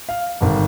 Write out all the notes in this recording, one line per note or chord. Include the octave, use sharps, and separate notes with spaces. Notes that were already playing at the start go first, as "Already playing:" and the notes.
F5
G#1 G2 D3